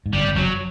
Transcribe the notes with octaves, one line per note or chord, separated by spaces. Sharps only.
G#2
G1 G2 G3
G1 G2
F#1 F#2 F#3